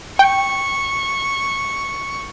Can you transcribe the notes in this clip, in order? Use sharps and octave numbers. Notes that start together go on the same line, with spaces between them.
G5 C#6